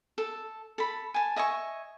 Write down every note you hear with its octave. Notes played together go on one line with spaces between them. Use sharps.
A4
A4 B5
G#5 A5
D#5 E5 G#5 C#6